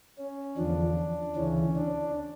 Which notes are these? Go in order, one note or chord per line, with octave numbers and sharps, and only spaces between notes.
C#4
E2 D3 F3 D4
D2 C#3 E3 C#4
D4